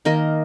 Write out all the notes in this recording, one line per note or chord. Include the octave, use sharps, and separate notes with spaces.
D#3 A#3 A#4 D#5